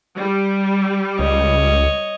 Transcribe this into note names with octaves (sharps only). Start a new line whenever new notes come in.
G3
C#2 C#5 D#5